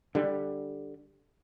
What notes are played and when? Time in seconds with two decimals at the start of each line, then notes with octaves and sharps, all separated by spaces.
0.15 D3 G3